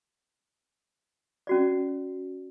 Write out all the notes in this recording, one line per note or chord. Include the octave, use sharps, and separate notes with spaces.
C#4 F#4 D5